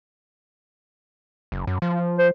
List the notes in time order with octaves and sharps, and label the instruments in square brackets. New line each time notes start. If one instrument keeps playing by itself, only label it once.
[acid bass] F#1
F#2
F3
[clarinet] C5